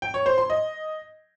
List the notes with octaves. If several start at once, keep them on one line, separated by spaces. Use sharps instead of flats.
G5
C#5
C5
C6
D#5